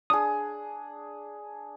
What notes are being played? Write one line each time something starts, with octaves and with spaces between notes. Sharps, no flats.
D4 G#4 D#6